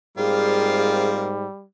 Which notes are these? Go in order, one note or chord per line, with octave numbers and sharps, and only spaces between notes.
G#2 G3 A#3 C4 F4 G#4